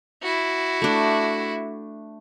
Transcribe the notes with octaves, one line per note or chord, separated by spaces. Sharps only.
E4 F#4
A3 D4